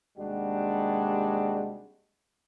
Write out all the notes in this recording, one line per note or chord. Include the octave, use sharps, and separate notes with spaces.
D#2 C3 G3 G#3 D4 F#4